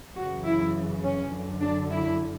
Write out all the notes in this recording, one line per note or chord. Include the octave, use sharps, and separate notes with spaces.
F#2 C#3 E3 F#4
E4
C#4
F#2 D3
D4
E4